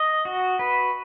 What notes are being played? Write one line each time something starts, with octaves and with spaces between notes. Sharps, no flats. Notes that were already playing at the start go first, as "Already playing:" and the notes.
Already playing: D#5
F#4
B4